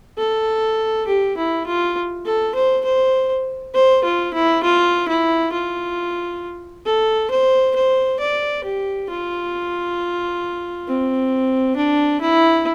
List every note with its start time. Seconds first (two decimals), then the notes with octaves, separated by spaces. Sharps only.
0.18 A4
1.07 G4
1.37 E4
1.67 F4
2.26 A4
2.55 C5
2.85 C5
3.75 C5
4.04 F4
4.34 E4
4.63 F4
5.09 E4
5.53 F4
6.86 A4
7.31 C5
7.76 C5
8.20 D5
8.64 G4
9.09 F4
10.88 C4
11.76 D4
12.21 E4